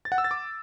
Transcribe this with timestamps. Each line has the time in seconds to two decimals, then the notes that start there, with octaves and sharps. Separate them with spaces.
0.05 A6
0.12 F#5
0.18 E6
0.24 A6
0.31 D6